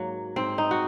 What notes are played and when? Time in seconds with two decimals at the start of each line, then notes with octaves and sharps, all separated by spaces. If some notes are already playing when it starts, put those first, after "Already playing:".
Already playing: G#2 F#3 A#3
0.36 G#2 C4
0.58 D#4
0.71 F#4